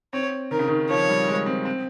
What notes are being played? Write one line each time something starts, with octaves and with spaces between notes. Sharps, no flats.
C4 C#5
D#3 A#4
C#3
D#3
F3 C#5
G3
G#3
C4
C4